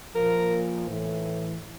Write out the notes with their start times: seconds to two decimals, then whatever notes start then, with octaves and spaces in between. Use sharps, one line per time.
0.16 A#2 F3 A#4
0.86 A2 E3